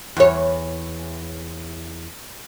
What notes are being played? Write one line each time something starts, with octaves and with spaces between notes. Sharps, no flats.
E2 C#5